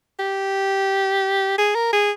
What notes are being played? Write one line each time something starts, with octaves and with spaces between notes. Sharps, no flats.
G4
G#4
A#4
G#4